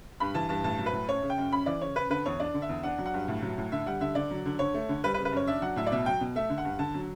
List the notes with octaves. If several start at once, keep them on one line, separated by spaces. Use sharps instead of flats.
G2 B5
E3 A5
G2 A5
A2 A5
F#3
B4
A2
C#4 C#5
C#3
G5
F#2
C#4 B5
E3 D5
C#3 C#5
C#4 B4
D3 B4
E2 C#5
D4 D5
D3
E5
E2
D4 F#5
F#3
F#5
G2
A2
F#3
A2
D3 E5
G3 F#5
D3 E5
D3 D5
F#3
D3
D3 C#5
A3
D3
G3 B4
B4
C#3
B4
F#2 C#5
D4 E5
F#3 F#5
A2 E5
D5
B2 E5
F#3 G5
B2
A3 E5
D3
F#5
G2
D3 A5
F#3